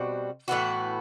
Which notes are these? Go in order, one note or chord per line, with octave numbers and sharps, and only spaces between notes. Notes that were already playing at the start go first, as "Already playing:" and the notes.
Already playing: B2 G3 C4 F#4
A2 E3 B3 F#4